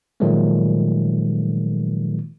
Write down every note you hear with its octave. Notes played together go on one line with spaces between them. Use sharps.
A#2 D#3 F3 F#3 G#3 A3